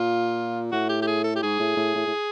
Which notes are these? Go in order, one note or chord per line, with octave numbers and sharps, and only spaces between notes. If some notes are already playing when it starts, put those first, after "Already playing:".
Already playing: A#2 F4
A2 F#4
G4
G4
G#4
A4
G4
G#2 G#4
A2
A2
A2
A2